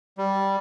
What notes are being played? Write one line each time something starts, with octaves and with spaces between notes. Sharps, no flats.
G3